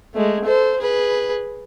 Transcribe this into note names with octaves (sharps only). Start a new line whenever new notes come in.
G#3 A3
A4 C5
G#4 B4